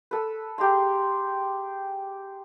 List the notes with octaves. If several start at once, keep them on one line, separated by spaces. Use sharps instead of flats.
A4 B4
G4 G#4 A#5 C6